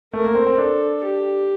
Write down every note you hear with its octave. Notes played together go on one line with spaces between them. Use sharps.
A3 A#4
A#3
C4
C4
D4 A4
G4